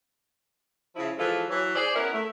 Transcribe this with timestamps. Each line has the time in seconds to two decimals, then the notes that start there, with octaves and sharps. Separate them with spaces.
0.96 C#3 F3 E4
1.18 E3 F3 G#3 F4 A4
1.49 E3 F#3
1.75 G#4 C5 D5
1.95 B3 C#4 E4 A#4
2.14 A3